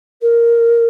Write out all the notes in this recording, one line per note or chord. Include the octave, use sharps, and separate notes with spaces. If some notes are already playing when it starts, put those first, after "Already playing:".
A#4